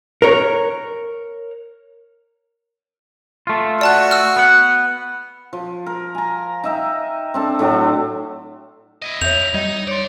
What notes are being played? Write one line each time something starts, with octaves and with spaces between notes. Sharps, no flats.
A#4 C#5
A3 F4
F#4 D5 A5 F#6
E6 F6
B3 F#5
F3
A#4
G#5 A#5
D#4 E5 G5
C4 D4 A4
A2 F#3 D4
E4 D#5
F2 C#5 E5 G6 F7
G3 D#4 D#5
A4 C#5 D5 C6